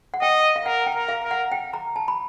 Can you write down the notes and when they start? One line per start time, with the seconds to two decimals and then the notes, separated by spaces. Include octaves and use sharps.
0.14 F#5
0.22 D#5 G5
0.56 F5
0.65 A#4 F#5
0.86 G5
0.94 A#4
1.09 F5
1.23 A#4
1.31 F#5
1.52 G5
1.73 A#5
1.96 A5
2.08 B5